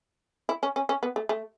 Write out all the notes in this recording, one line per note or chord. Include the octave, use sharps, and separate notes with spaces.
E4
C#4
C#4
C#4
B3
A3
A3